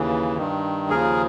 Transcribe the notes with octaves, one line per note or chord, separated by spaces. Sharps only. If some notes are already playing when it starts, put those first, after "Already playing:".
Already playing: D#2 C#3 E3
G2 D#3
D#2 C#3 F3 G#4 A#4